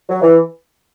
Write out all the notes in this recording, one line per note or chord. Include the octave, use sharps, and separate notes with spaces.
F#3
E3